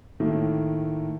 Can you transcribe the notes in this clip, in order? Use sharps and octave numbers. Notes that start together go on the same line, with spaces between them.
A2 D#3 A3 A#3